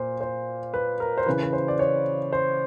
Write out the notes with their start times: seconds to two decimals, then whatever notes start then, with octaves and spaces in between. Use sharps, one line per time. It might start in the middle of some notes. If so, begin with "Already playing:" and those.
Already playing: A#2 C5
0.21 C5
0.74 B4
1.00 A#4
1.17 C5
1.26 C#3 E3 B4
1.43 B4
1.53 C5
1.68 D5
1.79 C#5
2.32 C5